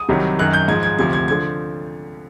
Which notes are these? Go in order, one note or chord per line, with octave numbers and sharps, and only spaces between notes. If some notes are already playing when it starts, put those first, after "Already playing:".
Already playing: D#6
C2 C3 D#3 F#3
F#2 D#3 F#3 F#6
G6
G#2 F3 G#6
G#6
D2 C3 F3 G#6
G#6
D3 F3 G#6